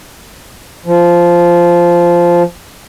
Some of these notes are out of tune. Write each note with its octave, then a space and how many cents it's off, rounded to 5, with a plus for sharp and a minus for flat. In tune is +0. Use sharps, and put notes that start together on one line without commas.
F3 -10